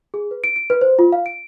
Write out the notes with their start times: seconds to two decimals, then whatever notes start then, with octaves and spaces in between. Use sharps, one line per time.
0.14 G#4
0.31 B4
0.44 D7
0.56 D7
0.70 B4
0.81 C5
0.99 F4
1.12 F5
1.26 D7